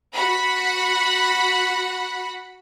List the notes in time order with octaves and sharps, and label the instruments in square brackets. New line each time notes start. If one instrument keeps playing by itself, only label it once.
[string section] F#4 F#5 B5